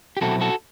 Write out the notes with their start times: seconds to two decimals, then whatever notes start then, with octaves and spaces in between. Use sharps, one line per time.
0.17 G4
0.21 B2 F#3 C4 E4 F#4 A4
0.41 F#4 A4